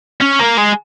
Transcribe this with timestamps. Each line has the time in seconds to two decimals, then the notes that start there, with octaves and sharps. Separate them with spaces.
0.22 C#4
0.41 A#3
0.58 G#3